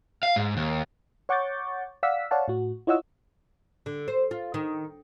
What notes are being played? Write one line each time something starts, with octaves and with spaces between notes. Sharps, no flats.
F5
G#2
D#2
C#5 F#5 C#6 D6 G6 A6
D5 F5 F#5 E6 B6
C#5 D5 F5 F#5 A5
A2 F#4
E4 F4 C#5 D#5 F#5 E6
D3
C5
F4
D#3